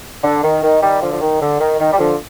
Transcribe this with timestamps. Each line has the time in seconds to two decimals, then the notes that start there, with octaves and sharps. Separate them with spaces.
0.23 D3
0.43 D#3
0.62 D#3
0.81 D#3 G3
1.02 D3 F3
1.13 F3
1.21 D#3
1.40 D3
1.60 D#3
1.79 D#3
1.92 G3
1.98 D3 F3